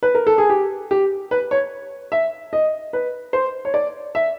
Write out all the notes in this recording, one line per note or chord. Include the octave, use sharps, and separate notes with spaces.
B4
A#4
A4
G#4
G4
G4
B4
C#5
E5
D#5
B4
C5
C#5
D5
E5